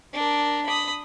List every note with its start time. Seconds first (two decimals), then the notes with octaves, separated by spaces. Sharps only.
0.13 D4 A#4
0.66 B5 D#6